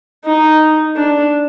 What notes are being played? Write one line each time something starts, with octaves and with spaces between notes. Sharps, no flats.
D#4
D4